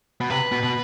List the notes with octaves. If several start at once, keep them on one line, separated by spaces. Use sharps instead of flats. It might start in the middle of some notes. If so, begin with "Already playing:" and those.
B2
C3 B4
B2
B2